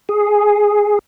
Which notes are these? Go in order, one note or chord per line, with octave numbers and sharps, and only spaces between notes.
G#4